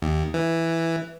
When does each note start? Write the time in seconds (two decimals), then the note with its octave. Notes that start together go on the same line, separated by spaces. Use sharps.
0.02 D#2
0.34 E3